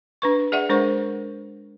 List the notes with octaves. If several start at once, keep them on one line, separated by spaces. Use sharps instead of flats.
D4 B4 C#6
G#4 D5 E5 F#5
G#3 D4 A#4 C5 C#6